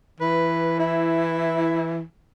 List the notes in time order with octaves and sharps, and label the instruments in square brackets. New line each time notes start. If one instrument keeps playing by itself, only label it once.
[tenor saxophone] E3 [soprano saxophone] B4
[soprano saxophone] E4